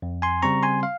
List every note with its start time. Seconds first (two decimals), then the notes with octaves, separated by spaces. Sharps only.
0.02 F2
0.22 G#5 C6
0.42 C#3 G3 C4 A#5 C#6
0.63 G#5 C6
0.83 F5